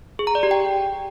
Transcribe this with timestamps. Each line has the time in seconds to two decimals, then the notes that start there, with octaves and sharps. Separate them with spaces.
0.19 G#4
0.27 A#5
0.35 D5
0.43 G4
0.51 G5